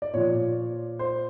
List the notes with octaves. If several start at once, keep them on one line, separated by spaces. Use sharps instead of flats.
D5
A#2 F3 C#5
C5